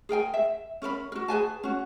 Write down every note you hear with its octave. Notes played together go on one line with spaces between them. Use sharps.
G#4 A#4 G5 G#5
E5
C#4 A#4 D#5 B5
F#4 A#4
G#4 B4 G#5 A5
C#4 F#4